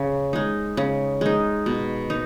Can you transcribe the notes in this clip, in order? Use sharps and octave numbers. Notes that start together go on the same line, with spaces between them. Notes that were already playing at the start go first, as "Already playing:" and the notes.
Already playing: C#3
G#3 D#4
C#3
G#3 D#4
B2
D#4